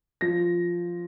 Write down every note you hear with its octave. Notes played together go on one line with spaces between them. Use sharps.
F3 A#6